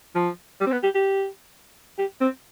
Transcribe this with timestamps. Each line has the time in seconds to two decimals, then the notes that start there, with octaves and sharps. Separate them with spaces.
0.15 F3
0.61 G3
0.67 C4
0.72 B3
0.83 G4
0.95 G4
1.98 G4
2.21 C4